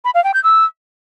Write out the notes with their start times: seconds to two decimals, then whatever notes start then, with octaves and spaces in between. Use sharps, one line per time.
0.05 B5
0.14 F5
0.24 G5
0.34 G6
0.44 E6